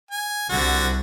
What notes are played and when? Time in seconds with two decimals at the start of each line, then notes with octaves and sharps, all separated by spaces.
0.11 G#5
0.50 C2 D3 F#4